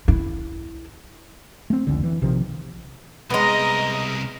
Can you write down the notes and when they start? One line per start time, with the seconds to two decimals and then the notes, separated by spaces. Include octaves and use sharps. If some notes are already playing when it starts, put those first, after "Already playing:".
0.08 E4
1.70 A3 C4
1.87 F1 C#2 D3
2.03 E3
2.22 A#1 C3 D#3 F3
3.30 C2 G#3 B3 A#4 D#5 A#5